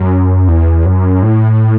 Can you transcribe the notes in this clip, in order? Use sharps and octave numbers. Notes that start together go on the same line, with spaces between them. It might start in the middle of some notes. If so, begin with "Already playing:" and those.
Already playing: F#2
E2
F#2
A2